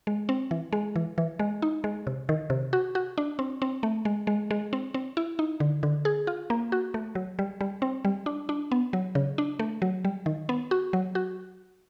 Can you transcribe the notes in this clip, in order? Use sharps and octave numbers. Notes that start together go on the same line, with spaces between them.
G#3
C4
E3
G#3
E3
E3
G#3
D#4
G#3
C3
D#3
C3
F#4
F#4
D4
C4
C4
A3
G#3
G#3
G#3
C4
C4
E4
D#4
D3
D3
G#4
F4
A#3
F#4
A3
F#3
G3
G3
C4
G3
D4
D4
B3
F#3
C#3
D4
A3
F#3
G3
D#3
B3
F#4
F#3
F#4